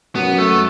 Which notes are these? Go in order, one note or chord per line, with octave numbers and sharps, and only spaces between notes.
F#2 B3
A3